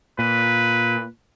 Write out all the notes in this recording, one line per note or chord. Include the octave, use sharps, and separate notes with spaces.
A#2 B4